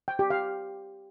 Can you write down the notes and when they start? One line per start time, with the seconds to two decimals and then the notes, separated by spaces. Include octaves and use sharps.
0.08 G5
0.19 G4
0.30 F5